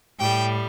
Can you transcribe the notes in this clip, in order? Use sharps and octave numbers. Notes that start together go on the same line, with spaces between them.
A2 G3 G5